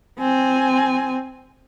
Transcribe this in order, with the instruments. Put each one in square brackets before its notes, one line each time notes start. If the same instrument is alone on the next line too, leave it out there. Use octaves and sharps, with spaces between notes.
[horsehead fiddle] C4 G#5